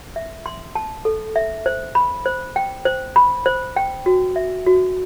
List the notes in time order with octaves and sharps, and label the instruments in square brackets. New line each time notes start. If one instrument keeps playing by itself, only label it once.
[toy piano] E5
C6
A5
A4
E5
C5
B5
C5
G5
C5
B5
C5
G5
F#4
E5
F#4